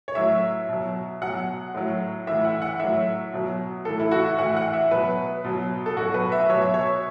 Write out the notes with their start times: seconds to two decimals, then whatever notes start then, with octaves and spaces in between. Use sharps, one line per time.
0.08 C#5
0.15 A2 F#3 E5
0.68 B2 F#3
1.22 B2 F#3 F#5
1.74 A2 F#3
2.27 A2 E3 E5
2.45 F#5
2.62 F#5
2.80 A2 F#3 E5
3.33 B2 F#3
3.85 A2 E3 A4
3.99 E4
4.11 F#4
4.25 E5
4.38 A2 E3 F#5
4.57 F#5
4.73 E5
4.91 B2 F#3 B4
5.44 B2 F#3
5.86 A4
5.97 B2 F#3 F#4
6.14 B4
6.32 E5
6.49 B2 F#3 C#5
6.62 E5
6.74 C#5